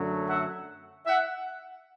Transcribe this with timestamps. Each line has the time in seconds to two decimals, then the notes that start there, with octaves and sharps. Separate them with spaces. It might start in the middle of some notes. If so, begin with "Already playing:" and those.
Already playing: F#2 D3 F#3 A3
0.28 E5 F#5
1.06 E5 F#5